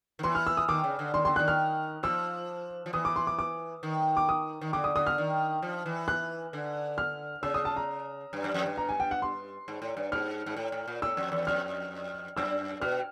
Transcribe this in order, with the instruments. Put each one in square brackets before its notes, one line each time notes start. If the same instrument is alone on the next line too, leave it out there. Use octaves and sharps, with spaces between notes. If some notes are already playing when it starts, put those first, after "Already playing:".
[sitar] D#3
[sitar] E3 [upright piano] C6
[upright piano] F6
E6
D#6
[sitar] D#3 [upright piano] D6
[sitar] C#3
D3
[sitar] D#3 [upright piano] C6
[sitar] D3 [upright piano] C6
[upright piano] F#6
[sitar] D#3
[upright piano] F6
[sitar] F3 [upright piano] E6
[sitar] F3
[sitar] E3 [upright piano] D#6
[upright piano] D6
C6
D6
D6
[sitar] D#3
[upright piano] D6
D#6
[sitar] D#3
[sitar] D3 [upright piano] D6
[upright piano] D#6
[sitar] D3 [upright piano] D#6
[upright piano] F6
[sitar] D#3
F3
E3
[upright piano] F#6
[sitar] D3
[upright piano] F6
[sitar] C#3 [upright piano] E6
[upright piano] D#6
A5
A#5
[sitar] G2
F#2
F2
G2
[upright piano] A#5
G#5
G5
F#5
C6
[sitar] G#2
A2
G2
[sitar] G#2 [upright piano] F6
[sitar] G#2
A2
A2
A#2
[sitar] A2 [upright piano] E6
[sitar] F2
E2
[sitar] F2 [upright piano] F6
[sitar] F#2 [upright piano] E6
[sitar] B2 [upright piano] F6